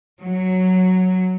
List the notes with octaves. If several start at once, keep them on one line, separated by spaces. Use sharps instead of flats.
F#3